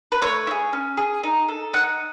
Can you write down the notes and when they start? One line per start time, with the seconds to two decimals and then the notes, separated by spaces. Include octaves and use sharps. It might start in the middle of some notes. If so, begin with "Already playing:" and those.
0.12 B4
0.22 A3 C#5
0.47 E4
0.51 G#4
0.73 C#4
0.97 G#4
1.23 D#4
1.48 A4
1.73 D#4 F#5